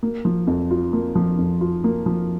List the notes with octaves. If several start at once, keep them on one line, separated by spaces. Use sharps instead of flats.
A#3
F3
F2
F4
A#3
F3
F2
F4
A#3
F3